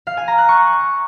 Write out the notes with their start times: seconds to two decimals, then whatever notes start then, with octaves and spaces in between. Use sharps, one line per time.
0.07 F5
0.17 G#5
0.28 A#5
0.38 F#6
0.49 C#6